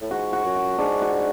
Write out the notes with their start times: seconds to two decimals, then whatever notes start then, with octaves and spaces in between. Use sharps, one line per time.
0.01 A2
0.10 G#2 F#4
0.33 F#4
0.44 F#2
0.56 F#4
0.78 G#2 D4
1.02 F#4